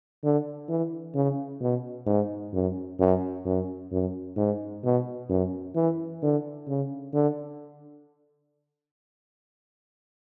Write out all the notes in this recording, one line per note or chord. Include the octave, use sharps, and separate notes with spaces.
D3
E3
C#3
B2
G#2
F#2
F#2
F#2
F#2
G#2
B2
F#2
E3
D3
C#3
D3